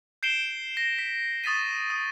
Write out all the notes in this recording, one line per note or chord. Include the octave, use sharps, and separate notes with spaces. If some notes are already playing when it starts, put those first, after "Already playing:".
G6 C7 D7 E7 G7
A#6
B6
C#6 D#6 A6 B6 D#7
D#6